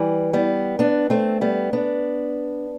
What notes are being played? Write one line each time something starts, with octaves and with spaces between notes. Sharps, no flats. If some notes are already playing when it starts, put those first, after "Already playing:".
Already playing: E3 G3
G3 B3
B3 D4
A3 C4
G3 B3
B3 D4